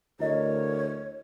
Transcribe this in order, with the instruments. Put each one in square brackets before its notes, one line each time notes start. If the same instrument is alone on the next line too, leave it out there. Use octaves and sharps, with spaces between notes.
[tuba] D2 [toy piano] E4 D#5 [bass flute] A#4 [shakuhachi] C#5